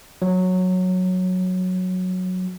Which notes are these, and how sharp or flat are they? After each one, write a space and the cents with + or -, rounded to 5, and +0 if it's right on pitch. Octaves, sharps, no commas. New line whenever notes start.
F#3 -10